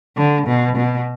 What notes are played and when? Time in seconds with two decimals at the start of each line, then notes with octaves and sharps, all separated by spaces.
0.17 D3
0.47 B2
0.77 B2